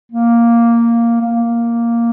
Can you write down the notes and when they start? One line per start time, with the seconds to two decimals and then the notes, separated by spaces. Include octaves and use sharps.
0.12 A#3
1.21 A#3